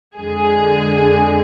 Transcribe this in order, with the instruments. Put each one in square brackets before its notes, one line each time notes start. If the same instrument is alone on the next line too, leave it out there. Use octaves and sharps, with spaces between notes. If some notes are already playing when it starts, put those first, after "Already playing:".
[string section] F2 D3 G#3 G#4